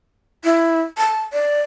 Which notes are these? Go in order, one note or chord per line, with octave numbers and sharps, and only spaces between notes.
E4
A5
D5